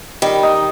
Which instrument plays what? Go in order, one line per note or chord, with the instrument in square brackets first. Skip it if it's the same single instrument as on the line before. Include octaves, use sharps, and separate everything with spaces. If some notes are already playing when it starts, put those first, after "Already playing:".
[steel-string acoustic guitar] D#3 [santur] G3
[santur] D#4